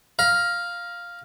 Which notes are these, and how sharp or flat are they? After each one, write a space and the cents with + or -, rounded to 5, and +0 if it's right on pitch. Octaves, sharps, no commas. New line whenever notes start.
F5 +0 A#5 +30